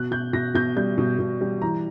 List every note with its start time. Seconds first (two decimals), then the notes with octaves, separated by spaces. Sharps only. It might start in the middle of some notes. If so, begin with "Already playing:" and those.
Already playing: B2 F#6
0.11 B2 G6
0.33 B2 A#6
0.55 B2 G6
0.76 G3 G6
0.98 B2
1.19 B2
1.41 G3
1.61 E3 A#5